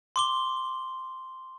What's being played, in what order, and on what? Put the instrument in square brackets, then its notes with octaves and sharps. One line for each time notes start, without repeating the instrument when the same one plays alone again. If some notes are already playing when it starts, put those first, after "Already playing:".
[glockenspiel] C6 D6 G7